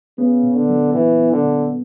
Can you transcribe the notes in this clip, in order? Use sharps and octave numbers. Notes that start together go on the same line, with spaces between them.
C#3 B3
A#2
D3
F#3
A#2 E3
B3
D3
A#2